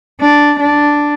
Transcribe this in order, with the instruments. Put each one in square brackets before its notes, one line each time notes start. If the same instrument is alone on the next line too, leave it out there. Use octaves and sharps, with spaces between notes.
[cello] D4
D4